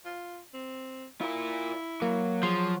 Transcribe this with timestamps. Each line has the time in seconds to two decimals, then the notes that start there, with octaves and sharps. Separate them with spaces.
0.05 F4
0.54 C4
1.21 E4 F4 A#4
2.02 F#3 A#3
2.43 F3 G#4 C6